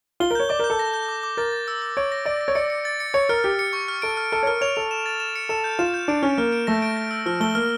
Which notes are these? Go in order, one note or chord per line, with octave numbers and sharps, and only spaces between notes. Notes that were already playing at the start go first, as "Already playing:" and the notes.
F4 G7
A#4
C#5 G6
D5 D6
A#4
G6
A4
A#6
G6
D6
D6
A#4 A6
A6
E6
A6
C#5 D7
A#6
D5 D7
A#6
C#5
D5 C#7
C#7
A6
C#7
C#5 C#7
A#4 F6
G4 F6
C#7
C#6
F6
A4 D7
F6
A4 F6
C#5
A#4 F6
C#5 F7
A4 F7
E7
A6
E7
C#7
A4 E7
G6
F4 E7
G6
D4 D7
C#4 F6
A#3 F6
D7
A3 A#6
D7
A#6
E6
F3 F6
A3 G7
A#3 F6